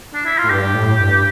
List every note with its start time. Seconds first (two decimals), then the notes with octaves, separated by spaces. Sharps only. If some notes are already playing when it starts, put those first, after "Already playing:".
0.14 D4
0.26 E4
0.38 F4
0.44 A2
0.50 G2 G4
0.74 A2
1.00 G2